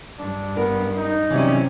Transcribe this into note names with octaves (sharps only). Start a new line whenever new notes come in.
G2 D4
B3 A#4
D#4
C3 E3 F#3 G3 C#4